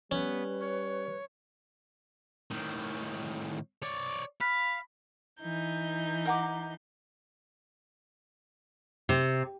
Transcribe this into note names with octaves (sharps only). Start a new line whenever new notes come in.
G3 B3 C#4 B4
C#5
A2 D#3
C#5 D5
F5 B5
E3 D#4 G6
A#4 F#5 D6
C3